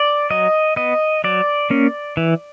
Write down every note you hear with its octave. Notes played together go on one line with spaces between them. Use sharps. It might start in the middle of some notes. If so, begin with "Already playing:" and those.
Already playing: D5
F#3 D#5
B3 D#5
F#3 D5
A#3 C#4
E3